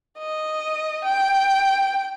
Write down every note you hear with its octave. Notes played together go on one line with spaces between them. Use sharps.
D#5
G5